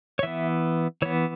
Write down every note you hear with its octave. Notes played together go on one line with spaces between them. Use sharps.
C#5
E3 B3 E5
E3 B3 C#5